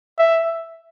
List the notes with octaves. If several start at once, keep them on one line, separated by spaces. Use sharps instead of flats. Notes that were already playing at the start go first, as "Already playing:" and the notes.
E5